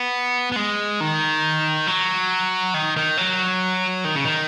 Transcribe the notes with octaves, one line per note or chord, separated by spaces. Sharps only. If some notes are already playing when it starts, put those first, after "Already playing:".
Already playing: B3
B3
G#3
D#3
F#3
D#3
D#3
F#3
D#3
C#3
D#3